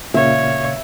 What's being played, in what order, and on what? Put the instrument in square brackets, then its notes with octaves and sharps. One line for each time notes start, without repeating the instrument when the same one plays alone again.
[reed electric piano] A#2 C#3 F5 [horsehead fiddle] C#5 [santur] E5